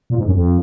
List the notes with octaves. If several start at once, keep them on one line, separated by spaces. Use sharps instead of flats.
A#2
G#2
F#2
F2